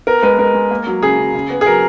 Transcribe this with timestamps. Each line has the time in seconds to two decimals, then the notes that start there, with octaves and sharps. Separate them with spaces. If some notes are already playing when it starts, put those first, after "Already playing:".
0.07 B3 A#4
0.23 G#3 B4
0.39 G#3 A#4
0.54 G#3
0.71 A#3
0.87 F#3
1.02 C#3 G#4
1.18 C#3
1.35 C#3
1.50 B3
1.61 G#4
1.66 F#3 A#4